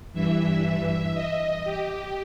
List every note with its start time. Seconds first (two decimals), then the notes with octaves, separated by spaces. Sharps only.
0.13 G2 E3 E5
1.14 D#5
1.64 G4